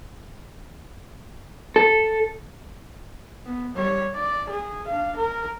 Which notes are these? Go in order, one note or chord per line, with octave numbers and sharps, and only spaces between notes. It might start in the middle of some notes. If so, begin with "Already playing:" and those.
A4
B3
G3 C#5
D5
G#4
D4 F5
A#4